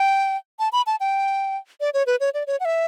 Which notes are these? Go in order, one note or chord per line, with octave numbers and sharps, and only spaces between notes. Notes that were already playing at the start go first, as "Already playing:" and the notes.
Already playing: G5
A5
B5
A5
G5
D5
C#5
B4
C#5
D5
C#5
F#5
E5